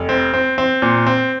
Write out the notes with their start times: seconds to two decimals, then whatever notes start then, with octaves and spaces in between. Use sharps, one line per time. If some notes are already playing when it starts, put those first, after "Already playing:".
Already playing: F1
0.09 C4
0.34 C4
0.58 C4
0.82 A#2
1.07 C4